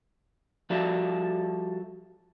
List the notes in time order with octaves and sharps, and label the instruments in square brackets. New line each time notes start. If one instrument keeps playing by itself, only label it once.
[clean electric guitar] F3 G3 F#4 A4 D5 E5